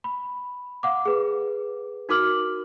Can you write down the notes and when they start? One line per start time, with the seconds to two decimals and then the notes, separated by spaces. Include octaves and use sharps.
0.04 B5
0.83 F5 F#5 D6
1.05 G#4 B4
2.09 D#4 F#4 A#4 D6 F6 F#7